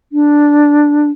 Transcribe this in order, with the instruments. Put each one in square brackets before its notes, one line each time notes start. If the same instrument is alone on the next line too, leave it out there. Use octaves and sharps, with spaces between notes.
[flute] D4